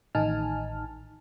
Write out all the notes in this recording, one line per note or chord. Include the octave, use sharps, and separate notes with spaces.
A1 D#3 D#4 G#5 A5 F6